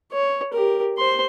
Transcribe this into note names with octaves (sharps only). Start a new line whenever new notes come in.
C#5
G4 A#4
C5 C6